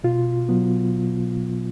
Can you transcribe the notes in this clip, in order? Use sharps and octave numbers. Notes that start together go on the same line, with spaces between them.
B2 F4
F#3 B3